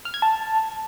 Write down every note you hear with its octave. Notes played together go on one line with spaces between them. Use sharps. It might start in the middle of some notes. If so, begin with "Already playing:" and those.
F6
G#6
A5